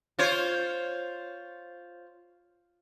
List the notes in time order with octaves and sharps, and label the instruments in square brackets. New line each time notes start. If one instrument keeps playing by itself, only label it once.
[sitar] F4 C5 C#5